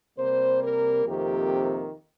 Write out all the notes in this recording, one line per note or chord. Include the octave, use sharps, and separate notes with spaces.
C3 G3 A#3 C5
A#4
F2 C3 D#3 A#3 G4